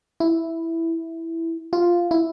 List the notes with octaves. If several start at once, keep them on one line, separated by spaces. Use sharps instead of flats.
E4
F4
E4